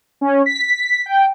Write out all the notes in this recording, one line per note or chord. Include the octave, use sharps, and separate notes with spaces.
C#4
B6
G5